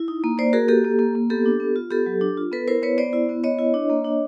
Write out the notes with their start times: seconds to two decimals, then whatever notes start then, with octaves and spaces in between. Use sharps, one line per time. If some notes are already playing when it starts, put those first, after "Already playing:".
Already playing: E4
0.08 D#4
0.24 A#3
0.38 A#3 C5 D5
0.53 F#4 G#4 A#4
0.68 A#3 G4 A4
0.84 A#3
0.99 A#3
1.15 A#3
1.30 B3 G4 A4
1.46 D4
1.60 B3
1.76 F4
1.91 B3 G4 A4
2.06 F#3
2.21 D4
2.37 F4
2.52 B3 A4 B4
2.67 E4 A#4 C5
2.82 B3 B4 C#5
2.98 B3 C5 D5
3.13 E4
3.29 B3
3.44 B3 C#5 D#5
3.59 E4
3.74 D4
3.90 A#3
4.04 D4